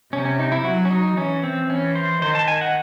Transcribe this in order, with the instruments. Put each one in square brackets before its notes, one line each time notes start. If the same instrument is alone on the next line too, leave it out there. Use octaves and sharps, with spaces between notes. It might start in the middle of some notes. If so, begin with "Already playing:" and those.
[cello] C3 [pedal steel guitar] C#4
[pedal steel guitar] C#4
D#4
E4
[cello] F#3 [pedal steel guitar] F#4
[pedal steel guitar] C#4
D#4
[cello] E3 [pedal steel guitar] C#4
[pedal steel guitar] C4
[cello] E3 [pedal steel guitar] C#4
[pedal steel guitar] C5
[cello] D#3 [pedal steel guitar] C5
[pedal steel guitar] A5
G#5
F#5